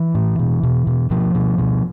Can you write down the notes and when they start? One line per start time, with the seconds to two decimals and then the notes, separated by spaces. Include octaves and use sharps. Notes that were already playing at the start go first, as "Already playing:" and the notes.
Already playing: E3
0.15 A2
0.39 B2
0.63 B2
0.87 B2
1.10 B2 F3
1.35 B2
1.58 B2